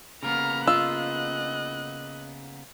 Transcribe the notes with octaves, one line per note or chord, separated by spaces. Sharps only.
C#3 A#3 B3 A#5 F6
F4 D#5 E6 F#6